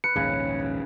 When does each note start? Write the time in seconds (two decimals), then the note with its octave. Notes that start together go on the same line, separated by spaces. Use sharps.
0.04 B4 C#7
0.16 A#1 D#2 G#2 C#3